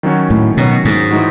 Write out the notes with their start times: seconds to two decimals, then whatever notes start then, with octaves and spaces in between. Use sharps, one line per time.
0.03 D#3 F#3 C#4 F#4 C#5
0.30 A2
0.57 B2 D#3 F#3 C#4 F#4 C#5
0.85 G#2
1.11 A2 E3 G#3 D#4 F#4